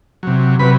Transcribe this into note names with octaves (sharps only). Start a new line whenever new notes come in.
C3 F#3
C3 F#3 B4 B5